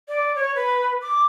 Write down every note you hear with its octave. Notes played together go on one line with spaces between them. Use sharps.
D5
C#5
B4
D6